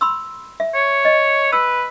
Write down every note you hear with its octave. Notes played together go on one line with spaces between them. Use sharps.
B5 C6 E6
E5
C#5
D#5
B4 E6